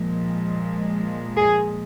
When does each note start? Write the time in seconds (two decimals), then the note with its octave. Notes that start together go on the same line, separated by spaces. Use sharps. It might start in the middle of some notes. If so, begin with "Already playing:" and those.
Already playing: A#2 F3 G#3
1.37 G#4